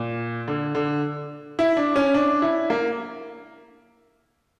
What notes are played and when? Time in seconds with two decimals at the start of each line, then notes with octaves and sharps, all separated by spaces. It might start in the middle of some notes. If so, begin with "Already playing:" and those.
Already playing: A#2
0.48 D3
0.75 D3
1.59 E4
1.77 D4
1.96 C#4
2.14 D4
2.42 E4
2.70 A#3